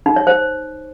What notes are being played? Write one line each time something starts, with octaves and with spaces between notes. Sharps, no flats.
D#4
C#5
C5